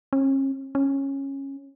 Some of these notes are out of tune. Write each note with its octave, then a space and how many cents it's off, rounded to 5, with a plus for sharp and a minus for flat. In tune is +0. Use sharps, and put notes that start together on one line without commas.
C#4 -40
C#4 -15